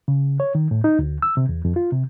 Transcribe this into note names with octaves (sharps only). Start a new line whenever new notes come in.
C#3
C#5
D#3
A2
D#4
D2
E6
C3
E2
F2
F4
C3